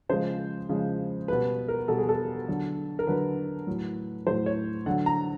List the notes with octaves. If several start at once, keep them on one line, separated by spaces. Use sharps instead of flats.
C#3 F3 G#3 C5
C#3 F3 G#3
B2 G3 B4
A#4
B2 G3 A4
G#4
A4
D3 F#3
A#4
D3 F#3 B4
A2 F#3
A2 F#3 C5
C#5
D3 F#3 F#5
A#5